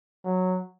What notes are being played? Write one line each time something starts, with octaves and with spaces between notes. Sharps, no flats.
F#3